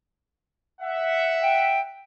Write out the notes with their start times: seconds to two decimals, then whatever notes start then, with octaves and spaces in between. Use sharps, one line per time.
0.82 E5 F#5
1.43 G5